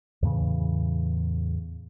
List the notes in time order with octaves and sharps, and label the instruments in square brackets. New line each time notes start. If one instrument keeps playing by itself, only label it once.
[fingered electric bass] E2 A2 C#3 E3